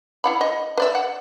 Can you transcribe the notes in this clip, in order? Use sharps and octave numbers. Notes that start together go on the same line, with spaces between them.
E4 F#5 B5
D#5
B4 D5 E5
F#5